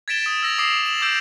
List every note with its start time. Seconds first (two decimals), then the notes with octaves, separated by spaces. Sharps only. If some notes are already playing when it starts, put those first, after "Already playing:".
0.08 G#6 A6 B6 D7 E7 G7
0.26 D#6 E7
0.43 E6 A#6 F7
0.58 D6 D#6 C7 D7
0.85 E7 F#7
1.01 D6 E6 G6 D7 E7